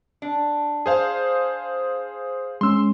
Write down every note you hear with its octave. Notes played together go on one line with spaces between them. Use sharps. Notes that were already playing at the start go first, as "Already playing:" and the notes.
D4
G#4 C5 F5
G#3 C#4 C6 E6